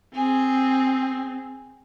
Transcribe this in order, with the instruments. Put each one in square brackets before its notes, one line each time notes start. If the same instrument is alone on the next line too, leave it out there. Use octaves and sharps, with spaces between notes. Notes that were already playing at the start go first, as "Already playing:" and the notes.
[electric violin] C4 [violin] G#4